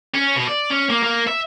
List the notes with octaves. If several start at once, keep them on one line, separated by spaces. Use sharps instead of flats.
C#4
B2
D5
C#4
A#3
A#3
E5